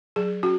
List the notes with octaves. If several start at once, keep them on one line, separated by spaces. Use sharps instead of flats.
F#3 G#4
C#4 F#4